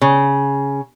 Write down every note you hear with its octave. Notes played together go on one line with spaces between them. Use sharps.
C#3